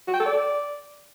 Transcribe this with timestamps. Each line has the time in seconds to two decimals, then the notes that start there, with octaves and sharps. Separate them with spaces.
0.08 F#4
0.14 G5
0.20 A4
0.26 D5